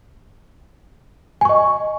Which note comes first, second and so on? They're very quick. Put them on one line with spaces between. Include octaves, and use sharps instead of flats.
G#5 C#6 D#5